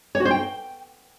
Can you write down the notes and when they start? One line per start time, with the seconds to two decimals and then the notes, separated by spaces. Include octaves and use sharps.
0.15 C#5
0.20 F#4
0.25 C5
0.31 G5